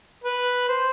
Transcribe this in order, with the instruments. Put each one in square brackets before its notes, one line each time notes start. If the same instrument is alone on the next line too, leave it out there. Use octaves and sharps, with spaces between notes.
[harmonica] B4
C5